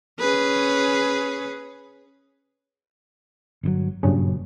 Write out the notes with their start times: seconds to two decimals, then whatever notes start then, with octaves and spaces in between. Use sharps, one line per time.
0.20 C#4 G#4 B4
3.63 G1 C3 F#3
4.03 F#1 G2 A#2 C#3 F#3